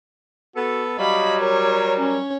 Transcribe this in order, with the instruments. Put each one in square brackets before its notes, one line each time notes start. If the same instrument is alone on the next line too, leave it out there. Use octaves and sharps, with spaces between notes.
[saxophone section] B3 A4 [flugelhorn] F#4
[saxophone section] F#3 G3 [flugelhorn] D#5 [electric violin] F5 B5
[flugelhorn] A#4 [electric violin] C#5
[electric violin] C#4 C#5